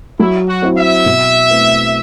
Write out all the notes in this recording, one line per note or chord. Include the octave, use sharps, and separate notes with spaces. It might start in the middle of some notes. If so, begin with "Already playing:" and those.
F#3 E4
F#4
C4 E4
E5
B2
A3 C4 E4 B4